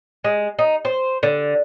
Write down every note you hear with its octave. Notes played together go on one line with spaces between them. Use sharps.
G#3
D#4
C5
D3